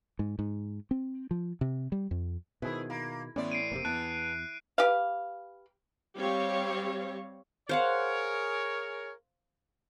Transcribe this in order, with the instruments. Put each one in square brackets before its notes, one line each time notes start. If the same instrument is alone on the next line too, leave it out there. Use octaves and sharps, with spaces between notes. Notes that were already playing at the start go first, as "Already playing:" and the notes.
[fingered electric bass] G#2
G#2
C4
F3
C3
G3
F2
[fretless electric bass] B2 D#3 [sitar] E4 G#4 [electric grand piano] B4 C5
[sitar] A#3 [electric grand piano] B5
[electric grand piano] A2 E4 C6 [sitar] E3 D5 [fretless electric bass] B3 C#4
[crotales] C7 D7 D#7
[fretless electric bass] F1 G#2 C3 [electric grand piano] A#3 C4
[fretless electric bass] E2 [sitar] E3 [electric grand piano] B3 A5 [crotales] F#6 D7 D#7
[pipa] G4 B4 F5
[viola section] G3 C4 G4 C#5 F5
[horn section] G#4 A#4 C#5 [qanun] C5 F5 F#5